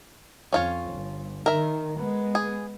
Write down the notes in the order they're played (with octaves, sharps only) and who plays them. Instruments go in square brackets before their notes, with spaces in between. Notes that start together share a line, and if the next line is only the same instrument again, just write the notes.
[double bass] F2 [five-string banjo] C#4 F4 C#5
[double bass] G1
[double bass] D#3 [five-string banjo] A#4 E5
[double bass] G#3 B3
[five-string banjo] G#4